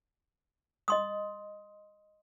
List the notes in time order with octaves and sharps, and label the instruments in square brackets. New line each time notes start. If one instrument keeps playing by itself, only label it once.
[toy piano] D#5 C6 D#6